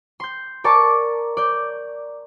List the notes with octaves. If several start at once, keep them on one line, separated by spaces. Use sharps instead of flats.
C6 G6
A#4 D5 A5 C#6 D6
D5 G6